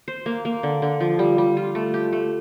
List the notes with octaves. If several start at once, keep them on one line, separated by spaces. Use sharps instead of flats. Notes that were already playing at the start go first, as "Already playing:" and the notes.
C5
A#3
A#3
D3
D3
F3
G3
G3
F4
A3
G4
A3